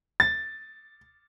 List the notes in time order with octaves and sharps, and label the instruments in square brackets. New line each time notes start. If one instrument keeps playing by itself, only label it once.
[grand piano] A6